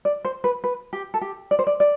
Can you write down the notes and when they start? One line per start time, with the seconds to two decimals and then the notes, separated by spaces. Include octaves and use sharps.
0.05 D5
0.25 C5
0.44 B4
0.64 B4
0.93 G4
1.14 A4
1.21 G4
1.51 D5
1.59 C5
1.67 D5
1.80 D5